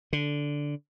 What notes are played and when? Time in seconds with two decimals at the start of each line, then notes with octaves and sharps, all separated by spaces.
0.13 D3